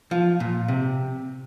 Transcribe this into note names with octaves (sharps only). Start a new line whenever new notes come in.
F3
A#2
C3